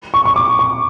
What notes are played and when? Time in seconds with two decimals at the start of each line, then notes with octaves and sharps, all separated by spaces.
0.14 C#6
0.26 C#6
0.36 D6
0.59 C#6